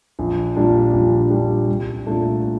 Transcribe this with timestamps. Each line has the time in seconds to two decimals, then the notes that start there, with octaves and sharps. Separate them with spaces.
0.19 A#1
0.56 A#2 G3 D4
0.93 A#1
1.30 A#2 G3 D4
1.68 C2
2.06 A#2 A3 D4